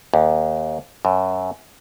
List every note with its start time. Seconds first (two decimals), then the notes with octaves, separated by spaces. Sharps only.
0.14 D#2
1.05 F#2